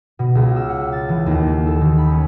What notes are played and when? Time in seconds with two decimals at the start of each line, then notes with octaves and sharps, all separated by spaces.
0.19 B2
0.35 C#2
0.56 E6
0.69 F#5
0.92 A6
1.09 E3
1.26 D#2
1.43 A#3
1.67 A4
1.81 D#3
1.98 B5
2.10 C#4